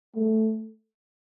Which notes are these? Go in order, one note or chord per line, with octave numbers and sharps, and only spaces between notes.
A3